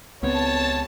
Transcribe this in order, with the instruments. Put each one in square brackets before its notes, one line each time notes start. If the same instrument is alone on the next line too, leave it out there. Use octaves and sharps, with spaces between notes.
[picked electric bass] C#2 C4 [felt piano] B3 [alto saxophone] C#5 [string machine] A5